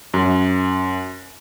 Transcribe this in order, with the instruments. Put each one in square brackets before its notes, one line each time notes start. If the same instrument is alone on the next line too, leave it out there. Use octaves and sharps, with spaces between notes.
[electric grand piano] F#2